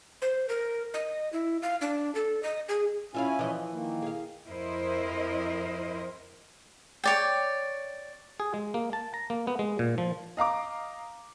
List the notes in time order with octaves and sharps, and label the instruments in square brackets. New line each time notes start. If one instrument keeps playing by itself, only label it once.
[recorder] C5
A#4
D#5
E4
F5
D4
A4
D#5
G#4
[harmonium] C#4 E4 G#5 [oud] F4 E5 F5
[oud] E3 F3 D#5
[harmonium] D#3 A#3
[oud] G#4 F5
[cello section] F2 E4 A#4 C5 D#5
[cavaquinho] C#5 D5 G5
[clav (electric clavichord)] G#4
G#3
A#3
A5
A#5
A#3
B3
G#3
A#2
F3
[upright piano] D#5 F5 A#5 D6